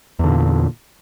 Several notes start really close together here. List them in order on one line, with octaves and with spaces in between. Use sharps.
E2 D3 A#2